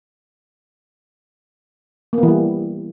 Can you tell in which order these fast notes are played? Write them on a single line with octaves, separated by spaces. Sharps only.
A#3 B3 E3 G3